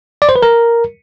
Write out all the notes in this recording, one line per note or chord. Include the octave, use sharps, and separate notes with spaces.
D5
C5
B4
A#4